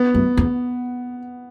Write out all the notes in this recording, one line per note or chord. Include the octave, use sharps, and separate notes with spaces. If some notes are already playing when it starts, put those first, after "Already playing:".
Already playing: B3
F#2
E2